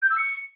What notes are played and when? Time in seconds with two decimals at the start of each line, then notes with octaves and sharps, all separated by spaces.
0.02 G6
0.10 E6
0.17 C#7